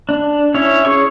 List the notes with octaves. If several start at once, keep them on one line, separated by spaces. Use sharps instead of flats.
D4
C#4 E4 C#5
G#4 C#5 C#6